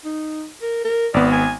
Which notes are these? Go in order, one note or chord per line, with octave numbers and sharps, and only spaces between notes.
D#4
A#4
A#4
G#1 B3 D5
G#5